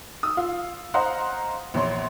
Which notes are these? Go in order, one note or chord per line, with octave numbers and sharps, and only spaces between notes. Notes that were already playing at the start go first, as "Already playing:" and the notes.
D#6 E6
F4 F5
C5 D#5 F5 F#5 A#5 C6
A#1 E2 C#5 C6